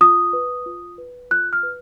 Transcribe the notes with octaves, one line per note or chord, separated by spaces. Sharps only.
F4 D#6
B4
F4
B4
F4 F#6
F6
B4